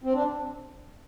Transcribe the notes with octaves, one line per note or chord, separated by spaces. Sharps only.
C4
D4